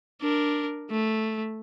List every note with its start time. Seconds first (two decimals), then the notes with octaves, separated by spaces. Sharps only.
0.22 D4 A#4
0.90 A3